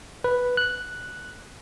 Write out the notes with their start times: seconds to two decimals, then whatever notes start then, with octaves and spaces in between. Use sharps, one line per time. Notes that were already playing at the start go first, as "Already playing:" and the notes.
0.24 B4
0.57 F#6